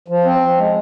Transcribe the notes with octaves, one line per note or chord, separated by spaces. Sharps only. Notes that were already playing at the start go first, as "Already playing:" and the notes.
F3
C4
F3
G#3